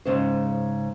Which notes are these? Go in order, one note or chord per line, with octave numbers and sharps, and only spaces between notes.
G#2 C#3 C5